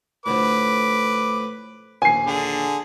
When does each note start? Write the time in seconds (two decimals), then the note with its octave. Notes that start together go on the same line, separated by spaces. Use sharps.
0.26 A2 D3 F3 B4 D6
2.02 A#1 D#2 G#5 C7
2.27 D3 G#4